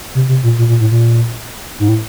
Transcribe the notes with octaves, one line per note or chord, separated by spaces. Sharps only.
C3
C3
A#2
A#2
A#2
A2
A#2
G#2
A2